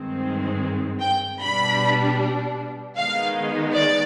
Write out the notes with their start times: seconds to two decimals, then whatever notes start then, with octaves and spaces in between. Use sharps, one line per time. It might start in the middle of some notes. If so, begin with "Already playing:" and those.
Already playing: G2 D#3 G#3 C4
1.01 G5
1.40 B2 G3 D4 B5
2.96 D#3 G#3 B3 D#4 F5
3.74 D5